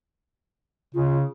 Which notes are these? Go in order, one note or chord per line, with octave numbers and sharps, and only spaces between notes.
C#3 F4